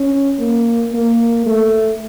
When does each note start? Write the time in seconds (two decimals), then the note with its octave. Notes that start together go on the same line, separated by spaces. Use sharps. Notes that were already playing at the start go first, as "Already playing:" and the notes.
Already playing: C#4
0.39 A#3
0.93 A#3
1.46 A3